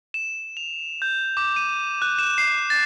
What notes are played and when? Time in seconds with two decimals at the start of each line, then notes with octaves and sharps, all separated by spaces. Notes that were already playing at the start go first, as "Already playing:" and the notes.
0.14 E7
0.57 F7
1.02 G6
1.37 D6
1.56 D#7
2.02 F#6
2.19 E7
2.38 C7
2.70 A6